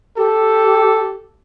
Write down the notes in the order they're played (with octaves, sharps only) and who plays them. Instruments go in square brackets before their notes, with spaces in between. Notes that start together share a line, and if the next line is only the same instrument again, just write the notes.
[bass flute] G4 [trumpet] A4